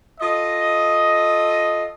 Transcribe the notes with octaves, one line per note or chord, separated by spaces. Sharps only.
F4 A4 D#5